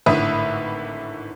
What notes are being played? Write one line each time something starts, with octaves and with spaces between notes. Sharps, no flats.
G#1 A2 D3 B4 E5 D#6